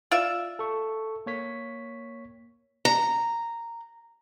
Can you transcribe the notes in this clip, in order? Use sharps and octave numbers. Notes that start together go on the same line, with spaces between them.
F4 D5 E5
A4 C#6
A#3 C#5 B6
A#5